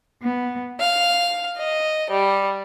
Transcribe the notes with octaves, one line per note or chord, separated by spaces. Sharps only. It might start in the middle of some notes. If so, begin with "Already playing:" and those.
B3
F5
D#5
G3